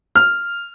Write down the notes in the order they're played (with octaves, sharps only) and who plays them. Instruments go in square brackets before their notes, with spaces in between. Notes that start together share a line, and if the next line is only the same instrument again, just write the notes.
[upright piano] F6